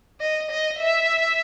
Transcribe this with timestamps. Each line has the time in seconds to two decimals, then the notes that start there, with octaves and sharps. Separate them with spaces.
0.21 D#5
0.51 D#5
0.78 E5